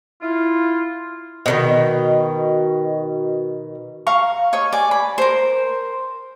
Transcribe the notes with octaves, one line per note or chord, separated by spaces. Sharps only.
E4 F4
B2 D3 D#3
F5 A#5 C#6
C#5 D#5 C#6
D5 G#5
B5
A#4 C5